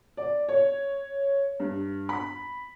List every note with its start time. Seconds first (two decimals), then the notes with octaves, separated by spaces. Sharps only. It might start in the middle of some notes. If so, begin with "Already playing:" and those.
0.17 D5
0.49 C#5
1.60 G2
2.09 B5